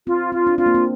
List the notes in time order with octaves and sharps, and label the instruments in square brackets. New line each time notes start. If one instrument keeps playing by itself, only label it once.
[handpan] C4 [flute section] F4
[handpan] C4 [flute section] F4
[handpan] D4
[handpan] C4 [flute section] F4
[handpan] A#3
C4